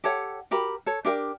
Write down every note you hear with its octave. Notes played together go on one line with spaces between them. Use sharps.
G4 A4 C#5 F#5
F#4 G4 A#4 B5
A4 C#5
D4 G4 A#4 G5